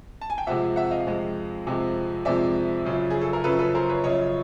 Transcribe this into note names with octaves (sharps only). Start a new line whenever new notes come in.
A5
G#5
G5
F2 C3 F3 G#3 E5 F#5
E5 F#5
D#5 F5
F2 C3 F3 G#3
F2 C3 F3 G#3
F2 C3 F3 G#3 D5 E5
F#2 C#3 F3
G#4
A4
A#4
F#2 C#3 F3 A4 B4
A4 B4
A#4 C5
B4 C#5
F#2 C#3 F3 C#5 D#5